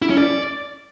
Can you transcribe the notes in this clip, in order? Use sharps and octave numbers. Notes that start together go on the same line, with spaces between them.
E4
C#4
D5